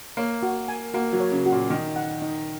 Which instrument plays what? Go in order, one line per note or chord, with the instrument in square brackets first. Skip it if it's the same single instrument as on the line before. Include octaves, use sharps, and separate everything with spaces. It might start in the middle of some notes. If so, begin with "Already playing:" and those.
[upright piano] A#3 [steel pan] C#5
[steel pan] F#4
G#5
[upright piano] A#3 [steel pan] F#4
[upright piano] F#3
[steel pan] C#5
[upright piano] C#3
[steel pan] F#4
[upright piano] A#2
[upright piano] D#3 [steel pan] D#4
[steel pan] F#5
D#4